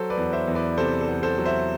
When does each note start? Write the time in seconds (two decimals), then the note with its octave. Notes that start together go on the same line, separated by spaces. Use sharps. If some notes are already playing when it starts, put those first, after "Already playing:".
Already playing: F#3 A4 C5
0.10 B4 D5
0.17 E2
0.33 C5 E5
0.47 E2
0.55 B4 D5
0.77 C3 A4 C5
1.01 A4
1.08 E2
1.23 A4 C5
1.38 F#3
1.46 C5 E5